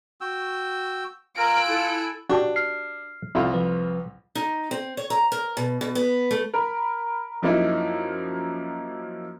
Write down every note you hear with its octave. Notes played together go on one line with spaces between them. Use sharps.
F#4 G5 E6
F4 A#4 G#5 A#5 E6 F#6 D7
E4 A4
D4 F#4 G4 A5
F6 C7
C2 F2 E4 F4
F3 B4
D#4
C4
C#5
A#5
A#4
B2
B2
B3
A3
A#4 B5
F#2 F3 A#3 D#4 E4